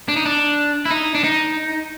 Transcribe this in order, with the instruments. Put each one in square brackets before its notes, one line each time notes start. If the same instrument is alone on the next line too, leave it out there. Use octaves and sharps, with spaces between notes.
[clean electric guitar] D4
D#4
D4
E4
D#4
D4
D#4